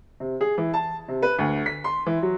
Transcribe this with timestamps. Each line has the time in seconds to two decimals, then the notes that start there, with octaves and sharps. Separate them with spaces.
0.20 C3
0.41 G#4
0.58 E3
0.74 A5
1.08 C3
1.22 B4
1.39 D2
1.66 B6
1.84 C6
2.06 E3
2.23 F#3